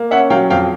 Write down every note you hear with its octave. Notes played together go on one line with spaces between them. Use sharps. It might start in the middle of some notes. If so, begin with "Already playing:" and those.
Already playing: A#3
C#4 E5 F#5
F#3 F5 G5
F2 F5 G5